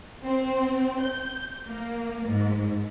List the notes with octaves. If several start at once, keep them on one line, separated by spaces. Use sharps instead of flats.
C4
G6
A#3
G#2